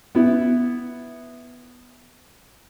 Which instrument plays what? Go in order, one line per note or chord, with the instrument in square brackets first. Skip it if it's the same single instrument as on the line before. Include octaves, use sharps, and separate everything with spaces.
[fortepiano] B3 E4